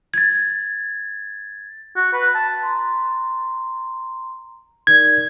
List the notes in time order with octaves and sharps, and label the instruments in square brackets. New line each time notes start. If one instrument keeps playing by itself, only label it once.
[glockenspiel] G#6 A6
[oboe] F#4
B4
A5
[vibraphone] A#5 C6
[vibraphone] D#4 A#4 D5 [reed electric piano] G#6